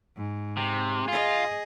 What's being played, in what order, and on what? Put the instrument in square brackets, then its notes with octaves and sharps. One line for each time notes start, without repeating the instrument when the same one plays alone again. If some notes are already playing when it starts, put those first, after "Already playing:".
[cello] G#2
[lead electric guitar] C3
[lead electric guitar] F4 [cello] G#4 D#5